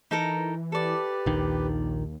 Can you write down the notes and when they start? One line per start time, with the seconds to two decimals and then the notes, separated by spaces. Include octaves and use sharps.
0.11 E3 D#4 A4 A#4
0.72 G4 A4 B4 D5
1.26 A#1 D#2 D#3